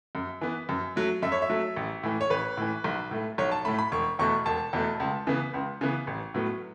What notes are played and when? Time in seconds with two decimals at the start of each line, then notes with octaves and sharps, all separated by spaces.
0.15 F#2
0.41 E3 B3
0.69 F#2
0.96 F#3 A3
1.22 F#2 E5
1.32 C#5
1.42 E5
1.49 F#3 A3
1.76 A1
2.03 A2 E3
2.21 C#5
2.30 A1 B4
2.57 A2 E3
2.84 B1
3.11 A2 A3
3.38 B1 C#5
3.52 A5
3.65 A2 A3 B5
3.79 B5
3.92 E1 C#6
4.19 E2 B2 A3 C#6
4.45 E1 A5
4.73 E2 B2 A3
5.00 C#2
5.27 C#3 E3 B3
5.54 C#2
5.81 C#3 E3 B3
6.07 A1
6.34 A2 F#3 B3